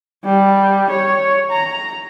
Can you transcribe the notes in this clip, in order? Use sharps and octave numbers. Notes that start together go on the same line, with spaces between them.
G3
C#5
A#5